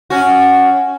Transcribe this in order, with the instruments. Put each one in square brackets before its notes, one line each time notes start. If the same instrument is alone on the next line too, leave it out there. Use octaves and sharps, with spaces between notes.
[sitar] C#4 F#4